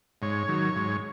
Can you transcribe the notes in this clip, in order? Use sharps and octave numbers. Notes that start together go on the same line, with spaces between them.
G#2 C#5
D#3 F#3
G#2